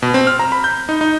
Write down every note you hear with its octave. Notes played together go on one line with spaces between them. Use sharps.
B2
C4
F6
A#5
B5
G6
D#4
D#4